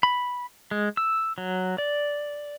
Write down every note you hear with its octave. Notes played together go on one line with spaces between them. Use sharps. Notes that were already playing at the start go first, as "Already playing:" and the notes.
B5
G#3
E6
F#3
D5